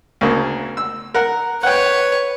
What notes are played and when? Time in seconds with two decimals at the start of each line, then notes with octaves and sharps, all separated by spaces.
0.21 D2 C#3 A#3
0.77 E6
1.14 A#4 F#5
1.63 B4 C#5 F#5 G5